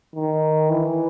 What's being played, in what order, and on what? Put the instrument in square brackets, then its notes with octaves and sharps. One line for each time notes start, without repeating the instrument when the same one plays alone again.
[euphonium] D#3
E3